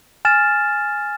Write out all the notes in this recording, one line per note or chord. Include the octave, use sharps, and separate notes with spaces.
G#5 F6 A6 E7